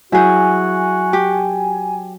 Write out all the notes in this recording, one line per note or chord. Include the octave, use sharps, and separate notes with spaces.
F#3 E4 F#4 G#4 G#5 G6
G4